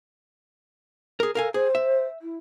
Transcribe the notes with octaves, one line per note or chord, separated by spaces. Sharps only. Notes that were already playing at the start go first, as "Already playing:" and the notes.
G#4 A#4
A4 A#4 F5 G#5
G#4 C5
E5
E4